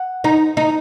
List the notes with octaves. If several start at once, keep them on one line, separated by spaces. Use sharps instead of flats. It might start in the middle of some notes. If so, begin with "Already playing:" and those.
Already playing: F#5
D#4
D#4